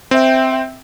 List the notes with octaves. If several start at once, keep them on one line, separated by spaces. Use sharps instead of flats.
C4 E5 G5